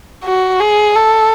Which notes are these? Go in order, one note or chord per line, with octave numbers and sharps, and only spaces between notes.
F#4
G#4
A4